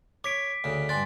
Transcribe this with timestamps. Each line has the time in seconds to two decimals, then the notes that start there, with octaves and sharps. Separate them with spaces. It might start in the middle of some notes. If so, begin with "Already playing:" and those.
0.24 C#5 D6 B6 D7
0.64 D2 C#3
0.89 G2 D4 G#5 C6 A6